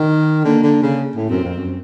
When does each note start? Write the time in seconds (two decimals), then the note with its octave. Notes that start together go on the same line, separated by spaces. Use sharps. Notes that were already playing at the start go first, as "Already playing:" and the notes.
Already playing: D#3
0.44 D3 A#3
0.63 D3
0.82 C#3
1.16 A2
1.29 F#2 C4
1.44 F2
1.58 F#2